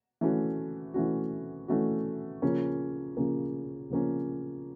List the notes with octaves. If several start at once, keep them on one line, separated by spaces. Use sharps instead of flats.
E3 A3 C#4 F#4
E3 A3 C#4 F#4
E3 A3 C#4 F#4
C#3 F3 A#3 C#4
C#3 F3 A#3 C#4
C#3 F3 A#3 C#4